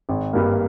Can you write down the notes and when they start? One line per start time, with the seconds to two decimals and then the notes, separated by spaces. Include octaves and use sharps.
0.09 G#1
0.33 G2 G3 A#3